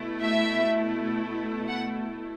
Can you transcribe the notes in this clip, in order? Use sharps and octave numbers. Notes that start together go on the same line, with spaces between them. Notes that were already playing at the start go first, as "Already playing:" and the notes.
Already playing: B2 A3 E4
E5
F#5